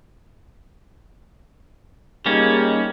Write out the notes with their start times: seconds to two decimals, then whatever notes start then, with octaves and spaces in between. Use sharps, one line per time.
2.26 G3 A#3 C#4 D#4 G4 G#4